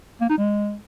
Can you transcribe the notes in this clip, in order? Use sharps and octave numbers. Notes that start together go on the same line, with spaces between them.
A#3
D#4
G#3